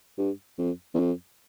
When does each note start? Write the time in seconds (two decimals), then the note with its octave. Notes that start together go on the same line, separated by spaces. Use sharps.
0.18 G2
0.58 F2
0.94 E2
0.99 F2